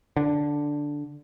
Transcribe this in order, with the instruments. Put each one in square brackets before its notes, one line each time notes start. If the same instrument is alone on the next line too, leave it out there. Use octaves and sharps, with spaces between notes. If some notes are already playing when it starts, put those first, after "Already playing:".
[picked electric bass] D3